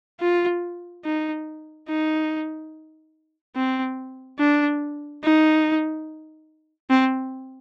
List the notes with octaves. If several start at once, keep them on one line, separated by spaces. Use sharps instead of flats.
F4
D#4
D#4
C4
D4
D#4
C4